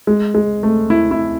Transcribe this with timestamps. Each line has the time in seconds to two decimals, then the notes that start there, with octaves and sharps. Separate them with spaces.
0.07 G#3
0.35 G#3
0.63 A3
0.90 E4
1.11 E4